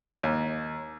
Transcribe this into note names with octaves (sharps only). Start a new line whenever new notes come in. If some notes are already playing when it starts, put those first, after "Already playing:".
D#2